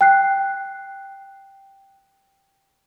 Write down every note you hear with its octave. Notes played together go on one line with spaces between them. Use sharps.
G5 F#6 C7